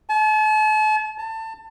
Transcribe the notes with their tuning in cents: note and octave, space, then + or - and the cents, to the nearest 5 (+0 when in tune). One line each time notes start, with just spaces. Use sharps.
A5 -40
A5 +25